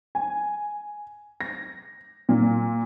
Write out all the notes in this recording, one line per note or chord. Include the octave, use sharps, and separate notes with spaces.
G#5
A#6
A#2